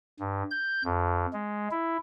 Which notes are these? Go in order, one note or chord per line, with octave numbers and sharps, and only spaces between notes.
G2
G6
F2
G#3
E4